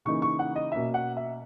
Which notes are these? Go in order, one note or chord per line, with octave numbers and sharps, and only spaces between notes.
C#3 E3 A#3 D#4 C#6
C#6
F#5
D#5
B2 A#3 C#4 E5
F#5
E5